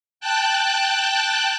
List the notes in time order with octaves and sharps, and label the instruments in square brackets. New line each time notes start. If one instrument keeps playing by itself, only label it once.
[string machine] G5 A5 F#6